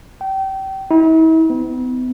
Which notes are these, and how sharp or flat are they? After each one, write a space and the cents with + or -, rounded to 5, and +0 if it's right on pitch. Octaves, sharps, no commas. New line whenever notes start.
G5 -30
E4 -45
B3 +40